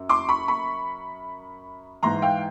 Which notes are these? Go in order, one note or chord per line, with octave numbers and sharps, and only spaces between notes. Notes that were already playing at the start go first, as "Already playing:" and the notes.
Already playing: F#2
C6 D6
B5 C#6
B5 C#6
G#2 E3 A#5 C6
F5 G5